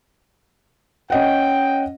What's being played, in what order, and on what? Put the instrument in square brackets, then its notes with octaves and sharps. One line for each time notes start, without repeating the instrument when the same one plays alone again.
[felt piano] C#4 D#5 F#5 [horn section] G5